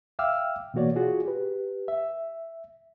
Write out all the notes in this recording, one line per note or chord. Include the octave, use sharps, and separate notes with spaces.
E5 F5 G5 D6 E6 F6
B2 E3 A#3 F#4 C#5 D5
F4 F#4 G#4
G4 B4
E5